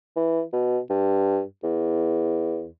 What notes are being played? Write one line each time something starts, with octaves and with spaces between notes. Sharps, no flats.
E3
B2
G2
E2